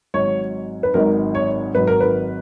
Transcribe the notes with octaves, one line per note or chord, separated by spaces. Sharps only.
G#1 G#2 F#3 C#5
B4
G#1 G#2 D#3 F#3 A#4
C#5
G#1 G#2 D#3 F#3 B4
A#4
B4